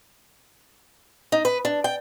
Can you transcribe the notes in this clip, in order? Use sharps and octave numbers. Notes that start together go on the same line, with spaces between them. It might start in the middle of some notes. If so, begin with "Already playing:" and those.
D#4
B4
D4
G5